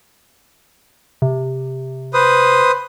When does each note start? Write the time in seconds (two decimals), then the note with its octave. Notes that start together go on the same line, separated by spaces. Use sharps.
1.22 C3
2.14 B4 C5 D#6